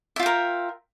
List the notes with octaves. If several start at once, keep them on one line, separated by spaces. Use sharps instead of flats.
F4 A#4 E5 G5